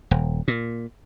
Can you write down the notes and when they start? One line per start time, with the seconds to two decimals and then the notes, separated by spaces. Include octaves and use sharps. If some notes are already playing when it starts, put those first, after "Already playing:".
0.11 D#1
0.48 A#2